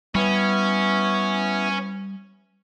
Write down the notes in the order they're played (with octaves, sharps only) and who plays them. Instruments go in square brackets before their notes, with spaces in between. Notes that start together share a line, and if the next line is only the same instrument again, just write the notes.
[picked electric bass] G3 [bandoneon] B3 E4 [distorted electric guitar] C#4